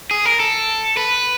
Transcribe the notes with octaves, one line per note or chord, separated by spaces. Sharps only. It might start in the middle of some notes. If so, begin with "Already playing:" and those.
G#4
A#4
A4
B4